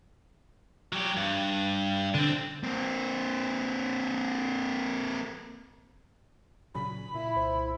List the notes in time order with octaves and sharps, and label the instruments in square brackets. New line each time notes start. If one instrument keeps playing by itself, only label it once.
[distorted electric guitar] F#3 G4
G2
[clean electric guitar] D3 [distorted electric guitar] C4 D4
[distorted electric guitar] A#3 C4
[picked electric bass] A#2 C#3 F#3 [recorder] B5
[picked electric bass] A#2 [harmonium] E4
[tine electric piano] C2 C5